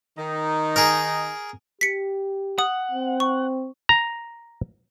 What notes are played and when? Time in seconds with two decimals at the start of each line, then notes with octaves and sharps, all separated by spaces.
0.18 D#3 D#4
0.76 G#4 A#4
1.81 G4 B6 C#7
2.59 F#5 D#6
2.91 C4
3.20 C#6
3.89 A#5